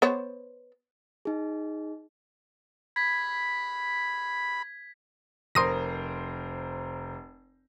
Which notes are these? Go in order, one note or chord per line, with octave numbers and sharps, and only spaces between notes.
B3 C5 C#5
D#4 G#4
B5 G#6 B6
F1 A#4 C5 C6 D#6 A#6